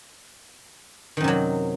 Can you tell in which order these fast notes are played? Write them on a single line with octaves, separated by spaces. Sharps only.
D#3 F#2 C3 F#3